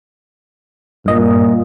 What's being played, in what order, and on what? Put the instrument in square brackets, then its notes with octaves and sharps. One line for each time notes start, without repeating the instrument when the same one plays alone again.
[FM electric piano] G2 D#5 [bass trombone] A#2